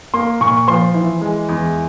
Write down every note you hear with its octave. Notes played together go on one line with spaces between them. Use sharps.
A#3 C6
A#2 C#6
F3 C6
E3
G#3
E2